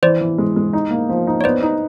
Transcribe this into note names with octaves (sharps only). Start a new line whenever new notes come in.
E3 C5 D5
E3
G#3
G#3
D#4
A#3
F3
D#4
C#5
B3 C5 D5
D#4